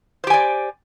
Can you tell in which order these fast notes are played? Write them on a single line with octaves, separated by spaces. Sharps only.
C5 G4 G#5 D5